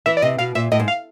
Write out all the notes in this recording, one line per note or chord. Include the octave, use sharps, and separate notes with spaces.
E3 E5
D5
C3 D#5
B2 F5
A#2 E5
A2 D#5
G#2
F5